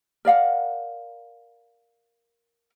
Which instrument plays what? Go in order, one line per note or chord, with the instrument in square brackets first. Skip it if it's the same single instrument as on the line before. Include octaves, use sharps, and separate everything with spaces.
[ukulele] A#4 D5 F5 F#5